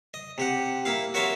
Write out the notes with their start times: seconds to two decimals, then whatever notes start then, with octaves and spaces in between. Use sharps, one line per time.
0.14 D#5
0.38 C3 G4 F#5
0.85 A#3 E4 F5
1.14 F#4 A#4 C#5 E5 F5 C6